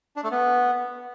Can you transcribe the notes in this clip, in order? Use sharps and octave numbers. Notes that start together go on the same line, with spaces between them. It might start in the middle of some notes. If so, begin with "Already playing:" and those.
D4
A3
B3